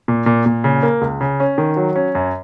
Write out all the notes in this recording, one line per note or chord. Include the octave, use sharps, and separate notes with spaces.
A#2
A#2
A#2
C#3
A#3
C#2
C#3
C#4
D#3
F#3
C#4
F#2